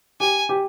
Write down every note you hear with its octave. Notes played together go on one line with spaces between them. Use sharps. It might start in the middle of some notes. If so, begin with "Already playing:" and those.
G4 G#5
G4